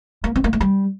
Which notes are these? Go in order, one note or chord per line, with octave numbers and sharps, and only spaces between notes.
A#3
C4
A#3
A3
G3